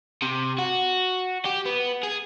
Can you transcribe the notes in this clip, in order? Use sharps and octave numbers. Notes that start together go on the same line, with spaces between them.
C3
F#4
G4
B3
G#4